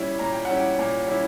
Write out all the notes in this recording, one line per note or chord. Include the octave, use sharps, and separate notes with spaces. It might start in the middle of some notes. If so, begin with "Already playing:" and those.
Already playing: A#2 G3 C#4 E4
A#2 A#5
G5
G3 C#4 E4 F#5
G5
A#2
G3 C#4 E4